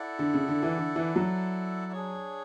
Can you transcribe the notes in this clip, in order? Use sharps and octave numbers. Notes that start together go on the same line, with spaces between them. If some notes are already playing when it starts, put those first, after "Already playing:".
Already playing: E4 A4 D5 F#5
D3
C#3
D3
E3
D3
E3
F#3
D4 G#4 C#5